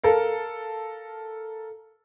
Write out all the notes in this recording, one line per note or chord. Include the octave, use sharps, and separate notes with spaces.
A4 A#4 F5